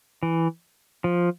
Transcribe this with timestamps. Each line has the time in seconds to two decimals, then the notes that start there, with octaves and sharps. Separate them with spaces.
0.23 E3
1.04 F3